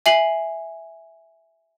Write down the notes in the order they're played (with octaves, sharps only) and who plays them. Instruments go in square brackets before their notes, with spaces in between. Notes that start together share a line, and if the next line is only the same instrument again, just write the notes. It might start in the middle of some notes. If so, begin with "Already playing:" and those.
[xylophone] E5 G#5 C7 F#7